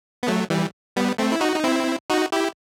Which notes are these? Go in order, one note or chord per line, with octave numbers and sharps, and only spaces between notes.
B3
F#3 A3
E3 G3
G3 B3
A3 C4
E4
D#4 F#4
D#4
C4 E4
D#4 F#4
E4 G4